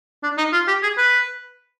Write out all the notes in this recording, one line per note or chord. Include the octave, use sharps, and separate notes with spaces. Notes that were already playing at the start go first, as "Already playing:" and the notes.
D4
D#4
F4
G4
G#4
B4